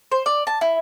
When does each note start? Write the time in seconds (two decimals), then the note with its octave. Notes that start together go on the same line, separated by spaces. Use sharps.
0.12 C5
0.26 D5
0.47 A5
0.61 E4